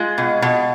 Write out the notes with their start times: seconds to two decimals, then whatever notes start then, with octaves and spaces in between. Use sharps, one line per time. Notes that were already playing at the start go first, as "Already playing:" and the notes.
Already playing: G#3 F4
0.18 B2
0.42 B2